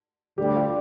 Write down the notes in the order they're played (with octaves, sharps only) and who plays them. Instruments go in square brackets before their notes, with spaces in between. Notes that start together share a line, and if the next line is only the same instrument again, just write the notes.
[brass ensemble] D2 D3 G3 [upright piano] G4
[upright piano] F4